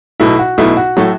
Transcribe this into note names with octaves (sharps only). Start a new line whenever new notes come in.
B1 B2 A3 E4
F#4
B1 B2 A3 E4
F#4
A2 F#3 A3